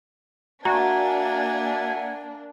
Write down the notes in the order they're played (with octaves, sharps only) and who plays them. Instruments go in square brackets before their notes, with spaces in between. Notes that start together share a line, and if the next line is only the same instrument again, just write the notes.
[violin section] A#3 D4 [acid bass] F#4 [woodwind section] E5 F#5 G#5 [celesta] A#5